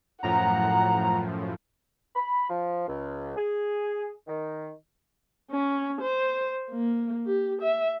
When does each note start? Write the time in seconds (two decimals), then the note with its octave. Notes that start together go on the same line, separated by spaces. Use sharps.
0.23 F#2 A2 F3 F#5 A#5
2.15 B5
2.49 F3
2.87 C#2
3.36 G#4
4.27 D#3
5.50 C#4
6.01 C5
6.70 A#3
7.27 G4
7.62 E5